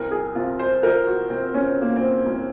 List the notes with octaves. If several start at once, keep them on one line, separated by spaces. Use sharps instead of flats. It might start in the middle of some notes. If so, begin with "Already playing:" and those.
Already playing: C2 A#4
G#4
C3 F4
C5
F3 A#4
F#4
C3 C4
C#4
C4
C3 A#3
C4
C2